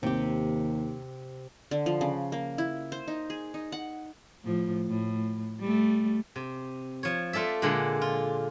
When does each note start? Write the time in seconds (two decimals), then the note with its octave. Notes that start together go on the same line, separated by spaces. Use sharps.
0.03 D#2 C3 G4
1.71 D3
1.86 F3
2.01 C#3
2.32 A#3
2.58 E4
2.92 C5
3.08 D#4
3.30 G#4
3.54 D#4
3.72 F#5
4.44 A2 F3
4.88 A2
5.60 G3 A3
6.36 C3
7.03 F3 C#5
7.33 A3 F4 A4 D5 E5
7.62 A#2 D3 G#3 A#3 D4
8.01 F4